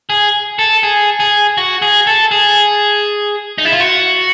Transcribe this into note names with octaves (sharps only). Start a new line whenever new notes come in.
G#4
A4
G#4
G#4
F#4
G#4
A4
G#4
D#4
E4
F4
F#4